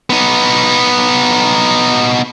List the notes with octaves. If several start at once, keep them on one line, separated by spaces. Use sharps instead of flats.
B3 D#4